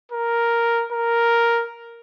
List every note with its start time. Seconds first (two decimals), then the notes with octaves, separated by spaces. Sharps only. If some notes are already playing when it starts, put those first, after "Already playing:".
0.12 A#4
0.92 A#4